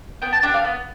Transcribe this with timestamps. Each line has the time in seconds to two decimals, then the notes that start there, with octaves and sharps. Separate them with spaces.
0.22 B3 G5
0.32 A5
0.43 D4 G4 G5
0.54 F5
0.64 B3 B4